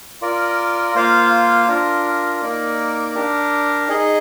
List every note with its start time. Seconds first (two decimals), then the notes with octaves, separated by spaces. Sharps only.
0.21 F4 A#4 D5
0.95 A#3 F4 C5 F5
1.68 D4 F4 A#4
2.42 A#3 D#4 A#4 D5
3.15 D4 G4 A#4
3.88 D#4 G#4 D#5